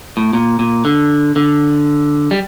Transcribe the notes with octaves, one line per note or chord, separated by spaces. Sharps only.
A2
A#2
A#2
D3
D3
G3